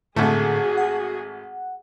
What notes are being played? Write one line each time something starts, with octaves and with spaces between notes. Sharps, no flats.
G#1 A2 D3 A3 F#4 G#4 A4
F#5